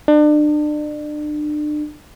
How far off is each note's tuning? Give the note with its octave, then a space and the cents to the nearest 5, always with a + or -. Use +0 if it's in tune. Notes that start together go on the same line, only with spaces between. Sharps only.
D4 +35